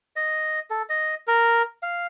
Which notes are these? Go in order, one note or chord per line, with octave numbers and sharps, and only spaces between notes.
D#5
A4
D#5
A#4
F5